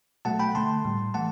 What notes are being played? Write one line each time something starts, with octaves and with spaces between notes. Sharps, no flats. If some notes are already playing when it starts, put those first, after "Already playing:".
B2 F#3 A3 F#5 A5
G5 B5
D3 A3 A5 C6
A2 G3
E3 A3 F#5 A5